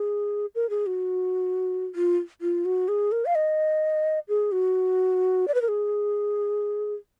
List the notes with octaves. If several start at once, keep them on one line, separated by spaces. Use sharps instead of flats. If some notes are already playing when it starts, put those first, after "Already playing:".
Already playing: G#4
A#4
G#4
F#4
F4
F4
F#4
G#4
A#4
F5
D#5
G#4
F#4
D5
B4
A#4
G#4